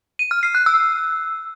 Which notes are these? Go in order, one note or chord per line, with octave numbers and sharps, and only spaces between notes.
D#7
F6
C7
F#6
E6